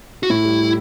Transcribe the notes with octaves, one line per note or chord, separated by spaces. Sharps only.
F#4
A2 E4
G3
G3